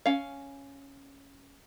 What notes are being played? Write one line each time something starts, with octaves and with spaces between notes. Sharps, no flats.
C#4 F5